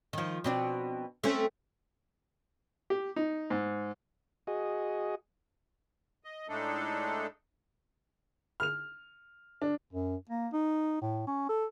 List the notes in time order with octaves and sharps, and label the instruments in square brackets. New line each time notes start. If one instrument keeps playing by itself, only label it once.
[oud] D#3 F3
B2 C4 D4
A3 C4 C#4
[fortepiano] G4
D#4
G#2
[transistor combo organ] F#4 G#4 D#5
[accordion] D#5
A2 G#3 A3 D4 D#4 A4
[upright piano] F6 F7
D4
[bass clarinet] F#2
A#3
D#4
A2
C#4
A4